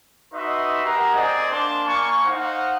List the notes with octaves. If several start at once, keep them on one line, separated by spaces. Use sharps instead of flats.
D#4 F#4 B4 D#5 E5 C6
G4 G#4 A#4 F#5 A#5
C4 G#4 C5 D5 D#5
A#3 D4 A5 C6 D6
A#3 G#5 C#6
D#4 C5 F5 F#5